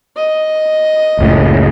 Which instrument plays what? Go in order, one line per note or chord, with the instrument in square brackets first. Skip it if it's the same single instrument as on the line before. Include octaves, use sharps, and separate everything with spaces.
[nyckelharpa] D#5
[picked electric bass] F#1 C#2 A2